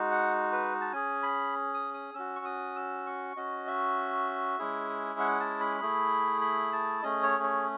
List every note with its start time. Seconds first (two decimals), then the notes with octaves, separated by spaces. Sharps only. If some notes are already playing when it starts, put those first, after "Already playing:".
Already playing: G#3 D#4 F#4
0.11 F#5
0.52 B4
0.81 A5
0.93 C#4 G#4 G#5
1.23 B5
1.74 D#6
1.94 D#6
2.14 C#4 F#4 E6
2.36 C#6
2.45 D#6
2.76 E6
3.06 C#6
3.37 C#4 F#4 D#5
3.67 E5
4.58 G#3 C#4 E4 G#4
5.20 F#5
5.40 A5
5.60 B5
5.81 A3 E4 G#4
6.41 B5
6.72 A5
7.03 A3 C#4 G#4 D#5
7.23 C#5
7.43 C#5